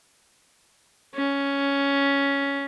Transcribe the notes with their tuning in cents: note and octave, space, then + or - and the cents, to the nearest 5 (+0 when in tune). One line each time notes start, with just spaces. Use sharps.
C#4 +5